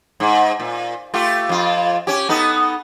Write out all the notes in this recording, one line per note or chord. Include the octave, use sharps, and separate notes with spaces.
G#2
A#2
A3 F4 G4
F2 F4
C#4 G4
B3 D#4 A4